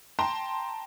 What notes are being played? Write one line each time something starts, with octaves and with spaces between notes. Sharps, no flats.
G5 A5 A#5 C6